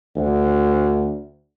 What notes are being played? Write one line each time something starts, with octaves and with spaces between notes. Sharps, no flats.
D2